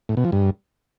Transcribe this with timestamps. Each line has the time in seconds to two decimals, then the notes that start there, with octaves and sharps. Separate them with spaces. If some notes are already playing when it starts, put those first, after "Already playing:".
0.09 A2
0.17 B2
0.25 F3
0.32 G2